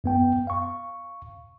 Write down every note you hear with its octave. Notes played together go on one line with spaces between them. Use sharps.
F#2 B3 G5
F5 C#6